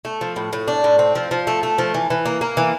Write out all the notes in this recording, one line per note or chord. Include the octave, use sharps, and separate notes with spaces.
A3
F3
A2
A2
D4
A2
C4
F3
F3
A3
A3
F3
E3
E3
A#3
A#3
E3